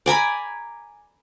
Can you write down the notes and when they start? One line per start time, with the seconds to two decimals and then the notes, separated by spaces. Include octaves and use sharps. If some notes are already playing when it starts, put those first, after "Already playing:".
0.06 D5 G#5 A#5 B5